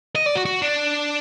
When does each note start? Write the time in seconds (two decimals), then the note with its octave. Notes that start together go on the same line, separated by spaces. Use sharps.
0.15 D#5
0.26 D5
0.35 F#4
0.45 F#4
0.62 D4